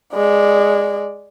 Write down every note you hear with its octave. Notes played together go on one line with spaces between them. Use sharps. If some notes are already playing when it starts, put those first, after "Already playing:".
G#3 D5